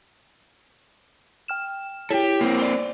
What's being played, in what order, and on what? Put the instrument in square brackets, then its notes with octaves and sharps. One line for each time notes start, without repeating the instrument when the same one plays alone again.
[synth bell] G5 F6 E7
[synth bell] E4 C#5 [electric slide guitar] G4 A4
[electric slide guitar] A#3 C4
[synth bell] C5 D5